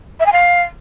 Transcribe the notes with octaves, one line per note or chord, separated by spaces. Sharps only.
E5
G#5
F5